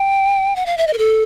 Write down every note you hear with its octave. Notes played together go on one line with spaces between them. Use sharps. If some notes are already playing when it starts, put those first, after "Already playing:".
Already playing: G5
F#5
F5
E5
D#5
A#4
A4